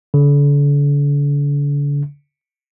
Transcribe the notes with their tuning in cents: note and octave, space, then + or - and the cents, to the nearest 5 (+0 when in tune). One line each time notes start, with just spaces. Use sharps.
D3 -40